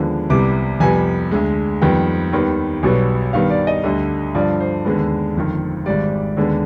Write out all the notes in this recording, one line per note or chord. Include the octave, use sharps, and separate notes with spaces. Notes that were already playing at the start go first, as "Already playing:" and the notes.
Already playing: D#2 D3 F3 G#3 B3
C2 C3 G3 B3 D6
F2 C3 G3 B3 G#5
D2 D3 G#3
F2 D#3 G3 B3 G5
D#2 D#3 G3 B3
B1 B2 G3 B3
G2 D#3 G3 B3 F5
D5
D#5
D2 D3 G3
G2 D3 F3 D5
C5
D#2 D3 G#3 B3
G1 F2 D#3
G#1 G#2 G3 D5
D#2 D3 G#3 B3